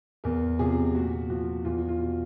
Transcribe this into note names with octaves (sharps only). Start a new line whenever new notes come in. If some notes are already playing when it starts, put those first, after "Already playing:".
E2 A#4
C3 F3 G#4
A#2 F#4
F3 F#4
E2 F4
F4
B2